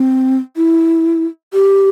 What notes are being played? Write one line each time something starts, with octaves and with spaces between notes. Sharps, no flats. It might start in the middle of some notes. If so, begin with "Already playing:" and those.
Already playing: C4
E4
G4